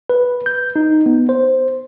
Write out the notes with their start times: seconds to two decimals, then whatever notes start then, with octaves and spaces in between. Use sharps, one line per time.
0.10 B4
0.46 G6
0.76 D#4
1.06 B3
1.29 C5